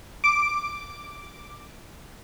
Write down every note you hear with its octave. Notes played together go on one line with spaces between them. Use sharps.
D6 D7